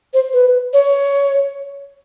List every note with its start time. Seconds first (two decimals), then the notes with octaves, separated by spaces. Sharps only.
0.14 C5
0.33 B4
0.73 C#5